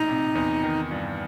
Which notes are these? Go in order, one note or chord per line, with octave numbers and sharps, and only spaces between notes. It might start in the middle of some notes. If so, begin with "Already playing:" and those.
Already playing: A#1 A2 D#4
C3
E2
D#3
G2